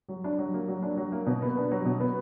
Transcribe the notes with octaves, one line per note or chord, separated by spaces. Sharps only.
F#3
D4
F#3
A#3
F#3
D4
F#3
A#3
B2
B3
D4
F#3
B2
B3